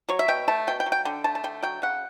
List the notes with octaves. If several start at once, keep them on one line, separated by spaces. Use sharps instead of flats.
F#3 C#5
E5
B2 G5
A3 A5
B2 G5
G5
F#3
G5
D3 G5
A3 A5
A5
D3 G5
F#3 G5
C#3 F#5